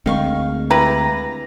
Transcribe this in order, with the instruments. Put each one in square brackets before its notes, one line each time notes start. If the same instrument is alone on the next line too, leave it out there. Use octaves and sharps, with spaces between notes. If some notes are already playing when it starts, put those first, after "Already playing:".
[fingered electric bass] D2 G#3 C4 [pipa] D#3 F5 C#6
[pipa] E4 G4 B4 [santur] A#5